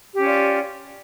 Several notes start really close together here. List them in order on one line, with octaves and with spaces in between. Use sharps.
G4 C#4 F4 D5